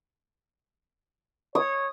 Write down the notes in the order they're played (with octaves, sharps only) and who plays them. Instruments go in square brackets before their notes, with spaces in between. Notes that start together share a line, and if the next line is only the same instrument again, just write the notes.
[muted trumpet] C#5 [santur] D#6